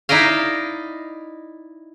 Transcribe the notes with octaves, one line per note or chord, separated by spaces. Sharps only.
D#4 E4 D5 D#5 F5